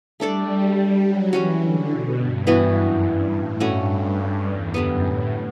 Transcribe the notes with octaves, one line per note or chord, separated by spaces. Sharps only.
G3 A3 D4 A4 D5
F#3
E3 G3 C#4 F#4
D3
B2
G2
E3 B3 F#4 B4
F#2
G2
A2
G2 A3 C#4 F#4
E2
F#2 D3 G3 B3
A2